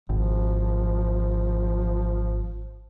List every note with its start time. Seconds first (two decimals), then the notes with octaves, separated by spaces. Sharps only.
0.09 G#1 F3